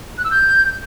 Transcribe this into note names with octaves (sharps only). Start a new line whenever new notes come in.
F#6
E6
G6